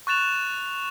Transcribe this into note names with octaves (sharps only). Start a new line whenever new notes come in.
C#6 F#6 A6 E7 F7